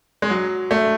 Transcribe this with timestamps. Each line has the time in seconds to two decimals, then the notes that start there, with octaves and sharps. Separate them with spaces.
0.22 G#3
0.30 F#3
0.71 A3